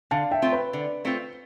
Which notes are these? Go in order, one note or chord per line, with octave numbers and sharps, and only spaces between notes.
D3 F5 A5
E5 G5
A3 C4 F4
B4
D3
A3 C4 F4